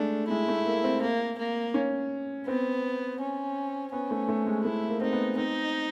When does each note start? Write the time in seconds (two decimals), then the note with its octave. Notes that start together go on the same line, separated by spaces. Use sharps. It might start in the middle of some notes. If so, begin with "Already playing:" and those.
Already playing: G#3 A3 D4
0.29 G#3 E4
0.48 A3
0.66 A#3
0.84 C4
1.02 A#3
1.38 A#3
1.74 C#4
2.47 B3 C4
3.20 C#4
3.92 B3 C#4
4.11 A3
4.29 A3
4.47 G#3
4.65 A3 E4
4.89 A#3
5.01 C4 D#4
5.13 B3
5.37 C4 D#4